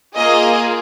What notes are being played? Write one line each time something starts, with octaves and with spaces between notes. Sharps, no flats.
A#3 F4 G#4 D#5